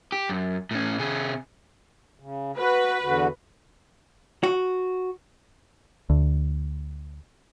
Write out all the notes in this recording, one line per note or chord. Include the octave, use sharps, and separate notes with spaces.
G4
F#2
A2 C#4
C3 G#4
C#3
F#4 B4
E2 D3 F#4
F#4
D2